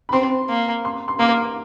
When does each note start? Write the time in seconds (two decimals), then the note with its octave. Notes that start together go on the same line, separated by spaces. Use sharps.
0.09 B5
0.13 C4 C6
0.49 A#3
0.85 C6
1.08 C6
1.19 A#3 D6